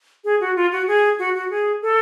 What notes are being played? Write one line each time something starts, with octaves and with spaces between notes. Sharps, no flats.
G#4
F#4
F4
F#4
G#4
F#4
F#4
G#4
A4